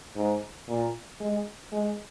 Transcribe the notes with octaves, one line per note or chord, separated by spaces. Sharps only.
G#2
A#2
G#3
G#3